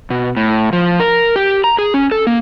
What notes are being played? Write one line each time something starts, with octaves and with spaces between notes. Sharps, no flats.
B2
A2
F3
A#4
G4
A#5
G#4
C#4
A4
A#3